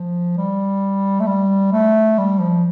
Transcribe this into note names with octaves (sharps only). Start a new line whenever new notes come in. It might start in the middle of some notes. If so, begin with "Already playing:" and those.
Already playing: F3
G3
A3
G3
A3
G3
F3